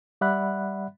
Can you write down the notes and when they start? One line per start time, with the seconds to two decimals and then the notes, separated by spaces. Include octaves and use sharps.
0.21 G3 D5 E5 F#5 B5 F#6